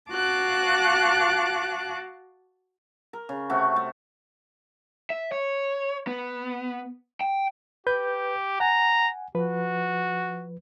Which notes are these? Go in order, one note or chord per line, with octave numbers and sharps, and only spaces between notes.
F#4 F5 A5 D6 F#6
A#4
C#3
C3 A3 F#4
A3
E5
C#5
B3
G5
G4 B4 G6
F#5 G#5 A#5
F3 F#4 B4